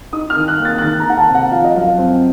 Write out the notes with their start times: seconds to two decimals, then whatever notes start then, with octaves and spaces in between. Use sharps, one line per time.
0.13 D#4 D#6
0.30 F6
0.36 D#3
0.48 F#6
0.59 A#3
0.65 A6
0.78 F#6
0.82 D#3 A6
1.00 A#5
1.06 D#3 F#5
1.18 A5
1.30 C3
1.35 F#5
1.52 F3 F5
1.64 D#5
1.76 F#2 F5
1.98 C4